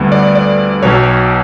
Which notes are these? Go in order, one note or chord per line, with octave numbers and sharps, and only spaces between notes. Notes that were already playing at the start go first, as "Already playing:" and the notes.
Already playing: D2 D3 G3 B3
D5
D5
B1 B2 F#3 C#5